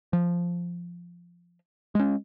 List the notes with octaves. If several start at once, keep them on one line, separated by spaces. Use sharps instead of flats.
F3
G#3 C#4